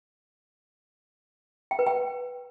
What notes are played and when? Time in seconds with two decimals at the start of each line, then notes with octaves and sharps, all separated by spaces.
1.71 G5
1.79 B4
1.86 G5